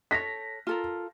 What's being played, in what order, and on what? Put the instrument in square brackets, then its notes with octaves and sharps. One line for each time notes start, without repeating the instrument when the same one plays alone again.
[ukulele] A4 C#5 [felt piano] A#6 B6
[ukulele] F4 A4 A#4